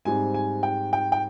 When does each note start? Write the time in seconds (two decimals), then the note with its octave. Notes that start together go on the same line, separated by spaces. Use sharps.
0.05 G#2 G3 C4 G#5
0.34 G#5
0.63 G5
0.93 G5
1.12 G5